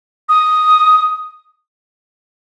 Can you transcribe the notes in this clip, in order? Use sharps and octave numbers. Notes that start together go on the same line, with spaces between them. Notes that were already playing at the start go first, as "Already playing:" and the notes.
D#6